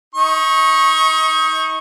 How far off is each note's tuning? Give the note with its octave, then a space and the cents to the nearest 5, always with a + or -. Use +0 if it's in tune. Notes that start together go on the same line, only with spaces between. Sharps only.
D#4 +30 C#6 -15